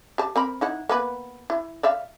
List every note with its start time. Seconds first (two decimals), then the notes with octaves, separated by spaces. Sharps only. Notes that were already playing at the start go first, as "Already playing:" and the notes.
0.18 G4 A5
0.36 C4 A#4 B5
0.61 D#4 E4 F#5
0.89 A#3 B3 B4
1.50 E4
1.83 D5 E5 F5